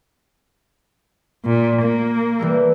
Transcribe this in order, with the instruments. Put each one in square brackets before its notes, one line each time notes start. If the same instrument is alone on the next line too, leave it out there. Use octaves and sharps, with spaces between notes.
[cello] A#2
A#3
[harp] E3 G3 A3